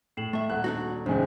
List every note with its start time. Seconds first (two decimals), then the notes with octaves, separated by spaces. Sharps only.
0.17 A2 C7 E7 F#7
0.33 A3 E5
0.50 D#1 A4 F#5 F#6
0.64 D4 D#4 F#4
1.06 A1 E2 G#2 C#3 C5 G#5